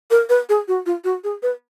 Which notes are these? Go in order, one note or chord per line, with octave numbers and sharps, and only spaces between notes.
A#4
B4
G#4
F#4
F4
F#4
G#4
B4